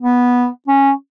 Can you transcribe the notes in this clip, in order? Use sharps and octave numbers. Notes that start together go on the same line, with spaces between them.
B3
C#4